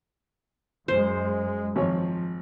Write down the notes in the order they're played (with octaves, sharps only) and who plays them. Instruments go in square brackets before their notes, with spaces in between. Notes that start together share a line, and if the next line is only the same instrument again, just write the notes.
[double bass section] F#2 G#3 [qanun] C5
[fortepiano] G#1 C#5 [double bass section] F3